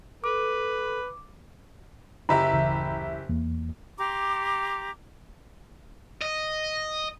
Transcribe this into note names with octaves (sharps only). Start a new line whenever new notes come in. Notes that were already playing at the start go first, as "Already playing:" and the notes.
A4 B4 D6
F#1 E4 G4 E5 A#5 B5
D1 C#3 E3
E2 A#3
G4 A#5 C6 D6
D#5